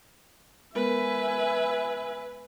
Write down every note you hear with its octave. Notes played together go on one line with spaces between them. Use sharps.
G#3 B3 A#4 B4 E5 G#5